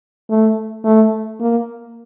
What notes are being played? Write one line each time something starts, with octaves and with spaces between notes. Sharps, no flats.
A3
A3
A#3